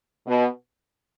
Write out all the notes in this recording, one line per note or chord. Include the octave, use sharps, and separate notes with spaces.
B2